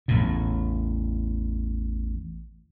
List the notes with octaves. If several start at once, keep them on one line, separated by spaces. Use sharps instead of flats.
A1 E2 A2